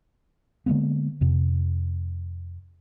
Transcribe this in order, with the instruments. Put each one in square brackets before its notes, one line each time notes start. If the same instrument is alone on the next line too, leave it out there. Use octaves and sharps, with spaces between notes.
[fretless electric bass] D3 G#3 A#3 B3
F2 C3